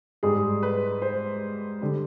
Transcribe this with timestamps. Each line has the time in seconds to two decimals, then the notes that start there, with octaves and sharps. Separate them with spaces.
0.23 G#2 G3 G#4
0.63 B4
1.02 C5
1.81 D3 G3